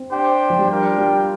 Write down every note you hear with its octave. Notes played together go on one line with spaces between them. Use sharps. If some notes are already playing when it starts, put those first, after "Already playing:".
Already playing: C4
D4 G4 C5 G5
F3
G3
D4 F4 A#4 G5
G3